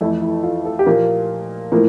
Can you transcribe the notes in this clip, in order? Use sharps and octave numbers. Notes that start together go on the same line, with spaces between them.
F2 E3 A3 E4
E4
F4
A4
G4
A#2 F3 A#3 F4
A2 F3 A#3